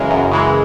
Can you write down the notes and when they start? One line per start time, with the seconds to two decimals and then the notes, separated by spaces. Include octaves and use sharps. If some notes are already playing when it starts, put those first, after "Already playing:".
Already playing: F#2 C#3 E3 G#3 A#4
0.10 F#2
0.32 C#3 E3 G#3